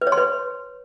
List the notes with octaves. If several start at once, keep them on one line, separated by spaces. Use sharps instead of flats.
B4
C#5
C6
B4